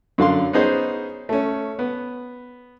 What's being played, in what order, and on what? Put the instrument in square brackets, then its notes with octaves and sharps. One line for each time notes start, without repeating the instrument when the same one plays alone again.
[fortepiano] F#2 D3 F5 C6
B3 C#4 D#4 G#4 C5
A3 C#4
B3